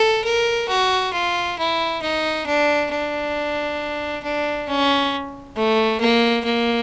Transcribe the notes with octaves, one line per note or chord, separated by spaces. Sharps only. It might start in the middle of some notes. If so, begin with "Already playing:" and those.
Already playing: A4
A#4
F#4
F4
E4
D#4
D4
D4
D4
C#4
A3
A#3
A#3